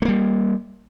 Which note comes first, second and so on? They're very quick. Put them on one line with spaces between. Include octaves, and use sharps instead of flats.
A3 A#3 G3